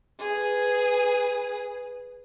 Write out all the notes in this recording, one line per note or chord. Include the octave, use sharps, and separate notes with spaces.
G#4 B4